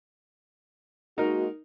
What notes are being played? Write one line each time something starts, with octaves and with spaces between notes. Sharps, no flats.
G#3 A#3 D#4 F#4 A#4